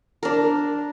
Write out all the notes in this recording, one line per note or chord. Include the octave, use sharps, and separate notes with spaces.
D4 A#4